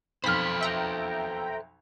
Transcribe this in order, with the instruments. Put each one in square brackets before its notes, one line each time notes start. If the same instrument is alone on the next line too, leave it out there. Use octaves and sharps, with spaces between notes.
[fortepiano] B1 F2 F6 [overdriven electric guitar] A4 C5 [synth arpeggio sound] B5 B6
[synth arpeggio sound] E5 G5 A#5